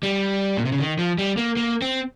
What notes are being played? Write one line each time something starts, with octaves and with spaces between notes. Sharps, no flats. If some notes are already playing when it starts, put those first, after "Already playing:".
G3
A#2
C3
C#3
D#3
F3
G3
A#3
A#3
C4